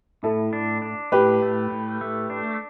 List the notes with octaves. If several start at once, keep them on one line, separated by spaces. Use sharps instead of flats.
A2 E4 A4
D4
D4
A2 G4 B4
A3
A2
A3
D4